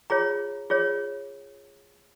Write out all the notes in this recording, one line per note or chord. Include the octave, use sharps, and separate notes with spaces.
F4 G#4 C#5 A#5
F4 G#4 C#5